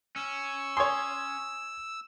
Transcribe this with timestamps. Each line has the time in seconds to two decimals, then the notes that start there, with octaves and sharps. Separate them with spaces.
0.16 C#4 E6
0.77 C#5 G#5 C6 D#6 G#6